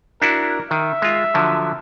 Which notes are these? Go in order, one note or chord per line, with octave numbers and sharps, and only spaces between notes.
D4 E4 F#4 A#4
D#3 E5
G#3 F4
D3 F3 F#3